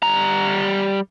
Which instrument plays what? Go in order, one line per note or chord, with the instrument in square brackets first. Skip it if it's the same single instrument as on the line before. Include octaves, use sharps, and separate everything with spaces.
[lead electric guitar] G3 A#5